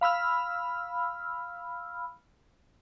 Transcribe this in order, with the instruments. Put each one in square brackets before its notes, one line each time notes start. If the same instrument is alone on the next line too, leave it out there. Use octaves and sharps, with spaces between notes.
[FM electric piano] F5 B5 E6 F6